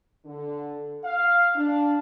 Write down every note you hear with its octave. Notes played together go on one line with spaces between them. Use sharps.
D3
F5
D4